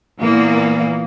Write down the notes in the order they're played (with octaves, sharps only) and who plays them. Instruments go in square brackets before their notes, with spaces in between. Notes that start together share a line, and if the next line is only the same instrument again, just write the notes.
[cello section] A#2 E3 A#3 B3